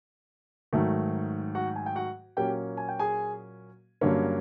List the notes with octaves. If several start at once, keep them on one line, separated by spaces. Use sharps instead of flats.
G#2 D#3 F#3 A3
F#4 F#5
G#5
G5
F#4 F#5
A#2 F#3 A#3 C#4 G4 G5
G#5
G5
G#4 G#5
G2 D3 F#3 A#3 C#4